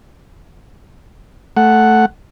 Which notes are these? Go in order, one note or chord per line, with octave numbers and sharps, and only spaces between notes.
A3 F#5